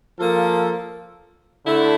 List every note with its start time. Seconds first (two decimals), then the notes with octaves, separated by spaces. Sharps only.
0.19 F3 A#3 F4 A4
1.65 D3 A3 E4